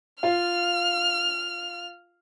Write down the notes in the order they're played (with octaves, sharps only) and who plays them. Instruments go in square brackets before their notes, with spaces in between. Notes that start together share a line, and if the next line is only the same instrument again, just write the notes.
[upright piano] F4 F5 [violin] F6